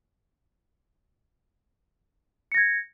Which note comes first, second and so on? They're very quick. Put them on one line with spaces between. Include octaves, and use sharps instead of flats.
C#7 A#6 G#6